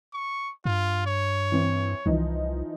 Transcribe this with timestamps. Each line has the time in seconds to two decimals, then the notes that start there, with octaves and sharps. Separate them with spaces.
0.14 C#6
0.65 G2 F4
1.06 C#5
1.52 E3 C4
2.06 C2 E3 F3 D#4